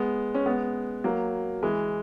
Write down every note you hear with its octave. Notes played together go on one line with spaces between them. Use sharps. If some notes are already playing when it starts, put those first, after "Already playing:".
Already playing: G#3 B3
C#4
G#3 B3
F#3 A#3
E3 G#3